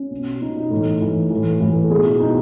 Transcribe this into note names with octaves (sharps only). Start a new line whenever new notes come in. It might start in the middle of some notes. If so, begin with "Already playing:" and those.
Already playing: C#4
B2
B2 D#4
D#4
A2 E3
A2 E3
E3
A2
A2 E3
A4
B2 G#4
E4
B2 D#4